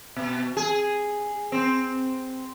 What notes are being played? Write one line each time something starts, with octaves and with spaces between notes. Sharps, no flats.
B2
G#4
C4